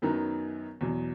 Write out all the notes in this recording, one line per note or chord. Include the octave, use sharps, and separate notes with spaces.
F#2 D#3 F#3 B3 D#4
E2 B2 F#3